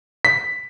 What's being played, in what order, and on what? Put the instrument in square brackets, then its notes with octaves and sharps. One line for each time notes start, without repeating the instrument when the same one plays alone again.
[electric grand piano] B6